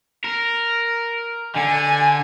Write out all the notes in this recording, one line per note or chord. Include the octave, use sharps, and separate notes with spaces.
A#4
D3 G#5